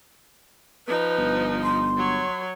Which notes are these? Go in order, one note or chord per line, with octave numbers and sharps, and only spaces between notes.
F3 D#4 B4
G1
C6
F#3 C#5